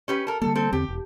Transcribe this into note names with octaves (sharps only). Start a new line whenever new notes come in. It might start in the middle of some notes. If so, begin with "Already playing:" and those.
C#4 G4 B4
A4 A#4
D3 G3 A#3 A4
C4 A4
E2 D3 C4 G4
E1